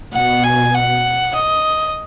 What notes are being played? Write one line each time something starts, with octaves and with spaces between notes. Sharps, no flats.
B2 F#5
G#5
F#5
D#5